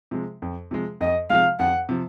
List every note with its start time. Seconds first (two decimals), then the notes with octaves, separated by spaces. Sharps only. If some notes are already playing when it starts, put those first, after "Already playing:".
0.11 C3 F3 G#3
0.42 F2
0.71 C3 F3 G#3
1.01 F2 D#5
1.30 C3 F3 G#3 F5
1.59 F2 F#5
1.89 C3 F3